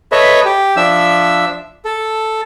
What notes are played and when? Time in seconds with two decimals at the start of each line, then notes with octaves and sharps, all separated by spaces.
0.12 A4 B4 C#5 D#5 E5
0.45 G4
0.76 F3 D4 E5 E6
1.85 A4